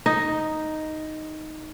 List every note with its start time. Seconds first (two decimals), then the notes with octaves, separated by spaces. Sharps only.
0.06 D#4